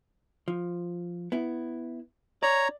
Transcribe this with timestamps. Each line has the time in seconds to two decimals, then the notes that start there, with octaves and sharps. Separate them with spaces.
0.48 F3
1.32 B3 E4
2.43 C#5 D5 A#5